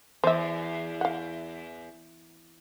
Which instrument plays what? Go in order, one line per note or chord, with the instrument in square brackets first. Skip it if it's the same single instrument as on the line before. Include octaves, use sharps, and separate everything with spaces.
[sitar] E2 [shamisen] C5 E5
[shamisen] F5 F#5